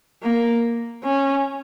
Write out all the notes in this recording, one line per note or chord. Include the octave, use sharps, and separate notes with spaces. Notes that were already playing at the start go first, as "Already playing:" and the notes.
A#3
C#4